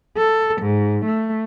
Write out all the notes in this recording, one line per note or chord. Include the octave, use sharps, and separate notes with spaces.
A4
G#2
A3